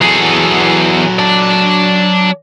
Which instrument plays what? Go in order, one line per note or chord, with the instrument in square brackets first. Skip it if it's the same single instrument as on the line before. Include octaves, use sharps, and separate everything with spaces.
[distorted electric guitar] E2 G#4 [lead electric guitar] F#3 A4
[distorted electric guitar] D5 A5